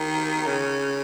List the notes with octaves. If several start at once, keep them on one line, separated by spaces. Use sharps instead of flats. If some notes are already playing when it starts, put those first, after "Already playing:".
Already playing: D#3
C#3